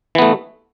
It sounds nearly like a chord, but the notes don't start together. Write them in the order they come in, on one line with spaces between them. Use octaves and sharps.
E3 B3 A3